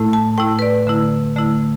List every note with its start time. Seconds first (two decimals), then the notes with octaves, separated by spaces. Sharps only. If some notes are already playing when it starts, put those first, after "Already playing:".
Already playing: A2 A3 E4
0.13 A5
0.38 A2 A3 E4 G5
0.59 B4
0.62 D5
0.87 D3 A3 E4
1.36 D3 A3 E4